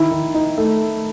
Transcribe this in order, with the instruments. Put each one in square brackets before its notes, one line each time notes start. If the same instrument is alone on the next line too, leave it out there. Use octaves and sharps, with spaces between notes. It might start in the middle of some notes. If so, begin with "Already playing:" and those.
Already playing: [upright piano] D#3 [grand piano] E4
[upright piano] D#3
D#4
A3